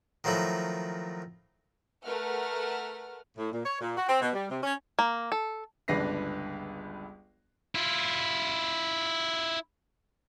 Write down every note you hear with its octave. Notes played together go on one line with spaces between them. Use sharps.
D#3 F3 F#3 A3 E4
A3 A#4 B4 F#5 F6
A2
A#2
C#5
A#2
F#4
C4
B2
G3
C3
C#4
A#3
A4
G1 C#2 D4 B4 A#6 C7
E4 F4